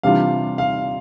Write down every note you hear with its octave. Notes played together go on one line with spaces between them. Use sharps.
C3 E3 G3 D4 F4 F5
F5